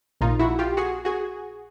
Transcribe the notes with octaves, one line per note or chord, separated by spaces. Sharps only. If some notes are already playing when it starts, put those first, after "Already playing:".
A#1 A#2 D#4 F4
E4 F#4
F4 G4
F#4 G#4
F#4 G#4